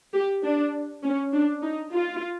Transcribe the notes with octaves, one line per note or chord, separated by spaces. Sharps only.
G4
D4
C#4
D4
D#4
F4